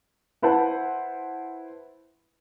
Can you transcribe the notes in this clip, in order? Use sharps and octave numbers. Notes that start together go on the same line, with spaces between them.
E4 B4 C5 F#5 A5